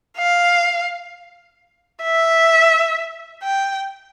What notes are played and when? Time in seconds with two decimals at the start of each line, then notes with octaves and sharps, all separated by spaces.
0.18 F5
2.02 E5
3.43 G5